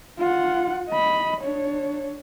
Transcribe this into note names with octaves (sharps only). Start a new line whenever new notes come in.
F4 F#5
D#5 B5
D4 C#5